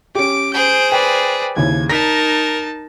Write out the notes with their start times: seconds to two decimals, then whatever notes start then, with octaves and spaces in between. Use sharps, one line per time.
0.15 C#4 G4 D6 D7
0.54 G#4 C5 G6 D7
0.92 B4 D5 G5
1.56 D#2 C#3 E4 G#6
1.90 D#4 A#4 A5 A#6 B6